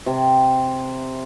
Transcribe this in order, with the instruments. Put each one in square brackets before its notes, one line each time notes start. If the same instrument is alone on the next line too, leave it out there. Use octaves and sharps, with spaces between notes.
[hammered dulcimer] C3